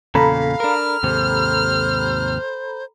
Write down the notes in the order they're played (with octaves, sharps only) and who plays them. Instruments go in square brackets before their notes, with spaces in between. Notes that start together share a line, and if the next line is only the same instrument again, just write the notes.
[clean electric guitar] E2 A#2 C#3 [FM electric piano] A4 A#5 B5 [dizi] F5
[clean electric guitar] D4 A#4 [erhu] F6
[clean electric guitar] D#2 G#2 C3 [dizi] C5